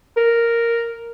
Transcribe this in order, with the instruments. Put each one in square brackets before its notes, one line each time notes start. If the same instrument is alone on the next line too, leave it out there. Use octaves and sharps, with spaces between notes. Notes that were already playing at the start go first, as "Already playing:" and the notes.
[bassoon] A#4